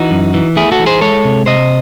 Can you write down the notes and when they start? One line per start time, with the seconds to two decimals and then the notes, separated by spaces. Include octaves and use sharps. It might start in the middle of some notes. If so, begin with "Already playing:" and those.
Already playing: E3 D#4 F#4
0.11 F#2
0.34 E3
0.56 A3 E4 G#4
0.72 F#4 A4
0.79 E3
0.86 G#4 C5
1.01 G#3 A4 C#5
1.25 C3
1.46 C3 C5 D#5